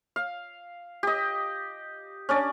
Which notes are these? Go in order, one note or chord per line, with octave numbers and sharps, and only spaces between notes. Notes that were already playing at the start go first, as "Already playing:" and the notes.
F5
G4 D#5
C#4 D4 D5